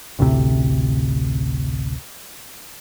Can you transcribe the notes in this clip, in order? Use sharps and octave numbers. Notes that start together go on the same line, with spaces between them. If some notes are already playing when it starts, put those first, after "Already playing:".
A1 D2 A2 C3